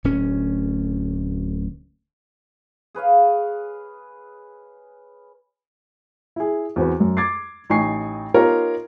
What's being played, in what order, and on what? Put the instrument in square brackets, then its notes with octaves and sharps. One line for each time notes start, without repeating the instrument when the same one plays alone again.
[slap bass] D1 D2 C#4
[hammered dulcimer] G#4 B4 C#5 F5
[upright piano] E4 G#4
E2 C4 F#4 B4
F#2
D6 G#6 A6 C7
A1 D#4 G#5 C#6 C7
B3 D#4 F4 G4 A#4 C#5